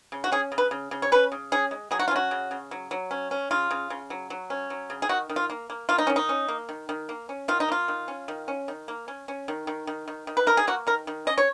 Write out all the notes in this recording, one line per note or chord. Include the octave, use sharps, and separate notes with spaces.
C#3
F#4
C#4 G#4
C#3
B4
C#3
C#3
C#5
C#4 B4
C#3
C#4 G#4
G#3
F#3 G#4
F#4
F4
C#4 F#4
C#3
C#3
F#3
F#3
C#4
C#4
C#3 F4
C#3
C#3
F#3
F#3
C#4
F#3
C#3
G#4
D#3 F#4
D#3
F4
A#3
A#3
A#3 F4
D#4
D#3 C#4
D#4
C#4
A#3
D#3
D#3
A#3
C#4
D#3 F4
D#4
A#3 F4
D#3
C#4
D#3
C#4
D#3
A#3
C#4
C#4
D#3
D#3
D#3
D#3
D#3
B4
D#3 A#4
G#4
A#3 F#4
D#3 A#4
D#3
C#4 D#5
C#5